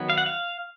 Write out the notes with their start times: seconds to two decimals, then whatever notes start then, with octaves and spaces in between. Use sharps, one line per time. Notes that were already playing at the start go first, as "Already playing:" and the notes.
Already playing: D#3 F#3 B3
0.10 F5
0.18 F#5
0.26 F5